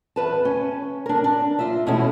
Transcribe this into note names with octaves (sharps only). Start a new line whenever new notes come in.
E2 B4 A5
C#4
D4 A#4
D4
F4 E5
E2 B2 G#3 A3 C#4 E4